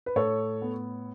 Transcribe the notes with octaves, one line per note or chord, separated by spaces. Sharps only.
B4
A2 A4 C#5
B3